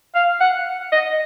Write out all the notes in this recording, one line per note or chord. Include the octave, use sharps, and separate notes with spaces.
F5
F#5
D#5